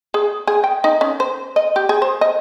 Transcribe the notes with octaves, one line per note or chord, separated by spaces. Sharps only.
G#4
G#4
G5
D#4
C#4
C5
D#5
G4
G#4
C5
D#5